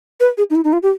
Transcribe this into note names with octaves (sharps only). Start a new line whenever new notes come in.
B4
G#4
D#4
E4
D#4
F4
G4